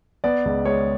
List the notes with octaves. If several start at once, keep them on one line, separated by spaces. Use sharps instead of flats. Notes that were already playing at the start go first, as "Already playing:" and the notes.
B3 D5
C#2
G#3 C#5